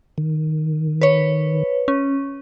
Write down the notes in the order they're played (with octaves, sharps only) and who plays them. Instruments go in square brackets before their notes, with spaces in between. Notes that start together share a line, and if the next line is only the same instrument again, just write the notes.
[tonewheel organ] D#3
[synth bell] B4 C#5
C#4